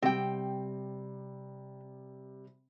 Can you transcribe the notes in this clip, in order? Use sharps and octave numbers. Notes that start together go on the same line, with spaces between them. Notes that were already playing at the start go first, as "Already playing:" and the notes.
C3 G3 C4 G5